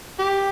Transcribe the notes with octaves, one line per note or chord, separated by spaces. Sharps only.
G4